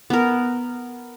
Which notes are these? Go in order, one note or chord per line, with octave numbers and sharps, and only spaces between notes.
B3 A#4